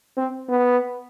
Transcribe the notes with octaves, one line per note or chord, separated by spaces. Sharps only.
C4
B3